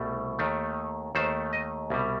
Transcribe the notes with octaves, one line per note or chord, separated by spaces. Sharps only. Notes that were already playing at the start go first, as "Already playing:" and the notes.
Already playing: C2 B2 A3
D#2 D#3 A3
D#2 D#3 A3 C5
D#5
C2 B2 G3